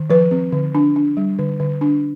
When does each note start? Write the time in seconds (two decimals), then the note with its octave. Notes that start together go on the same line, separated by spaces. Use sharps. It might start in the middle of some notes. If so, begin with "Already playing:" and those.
Already playing: D#3
0.10 F3 B4
0.31 C4
0.52 D3
0.75 D4
0.96 D4
1.17 G3
1.39 D3
1.60 D3
1.81 D4